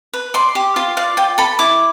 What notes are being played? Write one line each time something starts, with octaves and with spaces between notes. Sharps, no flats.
B4
D5 C6
G4
F4 C6
D5 F5
F4 G5
A4 B5
E4 D6